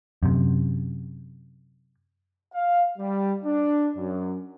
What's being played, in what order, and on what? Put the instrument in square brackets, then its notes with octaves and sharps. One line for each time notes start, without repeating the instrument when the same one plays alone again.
[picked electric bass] F#2 C3
[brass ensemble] F5
G3
D4
F#2